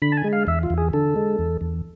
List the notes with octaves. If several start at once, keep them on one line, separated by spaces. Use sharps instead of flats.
D3 B5
A5
G#5
G#3
F5
E2 E5
F4
E2
G#4
D3 A4
G#3
E2
E2